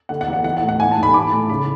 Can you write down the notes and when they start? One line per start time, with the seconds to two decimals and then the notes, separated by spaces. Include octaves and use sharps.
0.09 D3 F#5
0.21 F#5
0.28 E2
0.33 F#5
0.44 E3 F#5
0.57 F#5
0.62 A2
0.69 F#5
0.79 E3 G#5
0.91 A5
0.97 G#2
1.03 B5
1.14 E3 D6
1.32 A2
1.49 C#3 B5